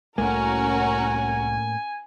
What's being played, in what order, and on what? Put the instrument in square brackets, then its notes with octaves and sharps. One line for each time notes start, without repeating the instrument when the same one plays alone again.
[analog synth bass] C2 [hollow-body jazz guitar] A2 A3 A#3 [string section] C#4 F#4 A#4 [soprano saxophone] G#5